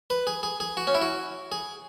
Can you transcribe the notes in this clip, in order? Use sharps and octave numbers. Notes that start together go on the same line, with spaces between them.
B4
G#4
G#4
G#4
F#4
C#4
E4
F#4
G#4